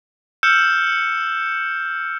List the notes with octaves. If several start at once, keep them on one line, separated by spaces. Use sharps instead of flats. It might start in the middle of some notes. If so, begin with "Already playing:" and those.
E6 F6 G6 C#7 E7